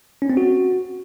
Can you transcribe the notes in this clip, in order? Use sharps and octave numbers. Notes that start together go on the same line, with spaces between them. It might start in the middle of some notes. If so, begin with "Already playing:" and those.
C#4
C4
F#4